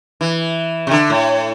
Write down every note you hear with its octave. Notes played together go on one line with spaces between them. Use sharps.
E3
C3
D3
A2